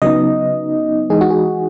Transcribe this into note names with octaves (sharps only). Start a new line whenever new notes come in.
C#3 F#3 B3 D#4 D#5
E3 G#3 D#4 G#4
F#4
G#4